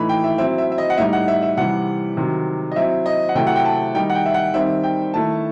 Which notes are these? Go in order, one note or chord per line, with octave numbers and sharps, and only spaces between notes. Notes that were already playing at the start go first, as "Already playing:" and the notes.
Already playing: A2 E3 A3 D#4 B5
G5
E5
F#3 C4 E4 E5
E5
E5
D#5
F#5
A2 G3 D#4 E5
F#5
E5
E5
C3 E3 G3 F#5
C3 D#3 F#3
D#5
F#3 C4 E4 E5
D#5
F#5
C3 F#3 A3 E4 G5
F#5
G5
A5
D#3 G3 D#4 G5
F#5
G5
E5
F#5
D#3 G3 C4 D#4 E5
G5
D#3 A3 E4 A5